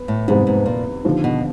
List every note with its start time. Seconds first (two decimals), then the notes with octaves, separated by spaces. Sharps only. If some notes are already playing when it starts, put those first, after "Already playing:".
Already playing: B3
0.08 A2
0.28 F2 G#2 C3 D#3 G3 B3
0.47 G#2
0.66 A#2
1.05 D#2 D3 F3
1.24 B2